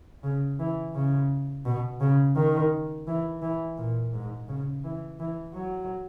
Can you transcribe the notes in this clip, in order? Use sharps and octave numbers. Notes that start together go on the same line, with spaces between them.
C#3
E3
C#3
B2
C#3
D#3
E3
E3
A#2
G#2
C#3
E3
E3
F#3